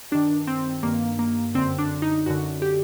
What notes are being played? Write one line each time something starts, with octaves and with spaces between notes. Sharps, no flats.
G2 D#3 D4
C4
G2 D#3 A#3
A#3
F#2 D3 C4
D4
D#4
F#2 D3 F#4
G4